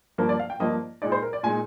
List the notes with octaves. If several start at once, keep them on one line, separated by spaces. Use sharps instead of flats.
G2 F3 A#3 A#4
D5
F5
G5
G2 F3 A#3 D#5
A#2 G#3 D#4 D5
C5
A#4
D5
A#2 G#3 D#4 G#5